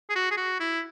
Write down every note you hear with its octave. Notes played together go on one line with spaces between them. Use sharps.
G#4
F#4
G#4
F#4
E4